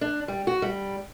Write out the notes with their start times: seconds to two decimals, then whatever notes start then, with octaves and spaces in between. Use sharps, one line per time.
0.01 D4
0.28 G3
0.47 F#4
0.62 G3